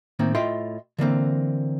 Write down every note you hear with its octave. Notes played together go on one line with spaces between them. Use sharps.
A2 D#3 A#3 C4
A2 F4 D#5 E5 G5 C6
D3 E3 A#3 C4